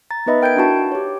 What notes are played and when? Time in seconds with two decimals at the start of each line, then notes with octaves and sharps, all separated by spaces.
0.11 A#5 A6
0.26 B3 D#4 B4 D#5 E5 B5
0.42 A#4 G5 G6 G#6 D7
0.56 D4 E4 F#4 A5
0.92 G4 C#5